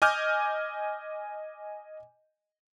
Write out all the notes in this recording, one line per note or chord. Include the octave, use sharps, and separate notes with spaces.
D#5 G#5 D6 F6 G6